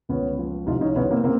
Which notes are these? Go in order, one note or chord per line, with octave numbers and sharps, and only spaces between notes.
C#2 B3 C#4
F3
C2 D#4 F4
C#4 D#4
C2 B3 C#4
A#3 C4
C#3 A#3 C4